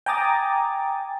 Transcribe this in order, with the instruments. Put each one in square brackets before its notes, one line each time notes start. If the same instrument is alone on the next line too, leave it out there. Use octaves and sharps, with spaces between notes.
[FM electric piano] G5 G#5 A#5 D6 D#6 A6